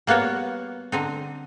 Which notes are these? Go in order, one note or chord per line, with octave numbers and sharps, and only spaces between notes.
G3 A#3 B3 F#4 C#5
D3 C4 D#4